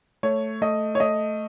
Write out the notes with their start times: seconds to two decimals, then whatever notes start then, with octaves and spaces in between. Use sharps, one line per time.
0.23 A3 C#5
0.62 A3 D#5
0.95 C#5
1.00 A3 D#5